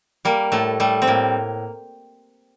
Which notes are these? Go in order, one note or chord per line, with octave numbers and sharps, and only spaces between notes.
G3 A#3
A2 A3
G3 A3
C4
A2 A#3